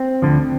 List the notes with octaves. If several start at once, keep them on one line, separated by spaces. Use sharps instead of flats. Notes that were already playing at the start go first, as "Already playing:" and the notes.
Already playing: C4
D2 D3 F3